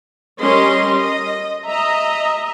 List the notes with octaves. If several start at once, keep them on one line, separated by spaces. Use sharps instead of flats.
G3 C#4 A#4 D#5 C6
D#5
D#5 E5 A#5